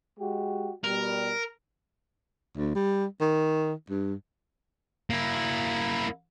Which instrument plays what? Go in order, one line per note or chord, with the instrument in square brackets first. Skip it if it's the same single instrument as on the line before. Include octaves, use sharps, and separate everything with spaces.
[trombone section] G#3 F#4 G4
[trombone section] B2 G3 [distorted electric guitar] A#4
[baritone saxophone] D2
G3
D#3
G2
[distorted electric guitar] A#3 E4